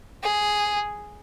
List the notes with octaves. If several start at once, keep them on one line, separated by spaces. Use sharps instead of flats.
G#4